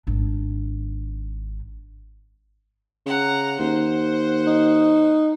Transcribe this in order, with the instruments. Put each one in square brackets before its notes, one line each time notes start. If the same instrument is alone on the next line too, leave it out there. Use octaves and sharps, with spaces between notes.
[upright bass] G#1 D4
[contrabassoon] C#3 [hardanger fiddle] F#5 A#5
[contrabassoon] D#2 [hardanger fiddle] C5 F#5
[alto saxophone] D#4